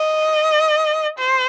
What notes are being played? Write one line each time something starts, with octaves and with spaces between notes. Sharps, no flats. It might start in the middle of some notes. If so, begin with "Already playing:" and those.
Already playing: D#5
C5